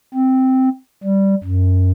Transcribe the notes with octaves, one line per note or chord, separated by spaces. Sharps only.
C4
G3
F#2